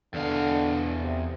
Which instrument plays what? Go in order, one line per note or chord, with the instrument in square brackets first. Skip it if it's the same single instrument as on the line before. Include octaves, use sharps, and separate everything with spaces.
[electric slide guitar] E2 F5 [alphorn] D3
[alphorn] C3